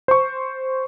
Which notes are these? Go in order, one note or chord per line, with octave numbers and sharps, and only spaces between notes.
C5 C#6